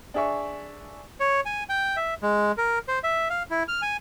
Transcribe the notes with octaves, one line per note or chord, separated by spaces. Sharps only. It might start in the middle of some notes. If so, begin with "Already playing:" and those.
D4 G#4 E5 C#6
C#5
G#5
G5
E5
G#3
A#4
C5
E5
F5
E4
F6
G#5